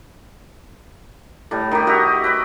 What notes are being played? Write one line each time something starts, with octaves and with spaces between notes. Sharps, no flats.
A2 G3
D#3 G4
F#4 G4 D#5 E5
B4 G5 B5 C#6